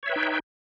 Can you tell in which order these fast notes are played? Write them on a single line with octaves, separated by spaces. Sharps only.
C#5 E5 B4 G5 D#4